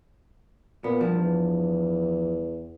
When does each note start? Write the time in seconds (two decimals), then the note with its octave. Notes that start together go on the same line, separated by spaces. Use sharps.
0.84 A#2 B3
1.01 G2 F3
1.17 E2